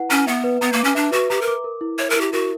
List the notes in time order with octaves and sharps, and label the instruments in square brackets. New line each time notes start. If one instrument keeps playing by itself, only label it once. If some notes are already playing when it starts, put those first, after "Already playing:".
Already playing: [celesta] E4 B4 F#5
[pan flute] C#4 [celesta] A#5
[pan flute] B3 [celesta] E5
[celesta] B4
[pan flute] B3 [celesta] A#5
[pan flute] A#3
[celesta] D6
[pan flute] C#4
[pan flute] D4 [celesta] E5
[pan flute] F#4 [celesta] B4
[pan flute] G4 [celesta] A#5
[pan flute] A#4
[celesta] D6
A#4
E4
[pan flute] C#5 [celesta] E5
[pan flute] A#4
[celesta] E4
[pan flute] G4
[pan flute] F#4 [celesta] A#4